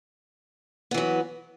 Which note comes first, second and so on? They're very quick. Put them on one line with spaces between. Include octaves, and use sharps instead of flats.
B3 E3 F#3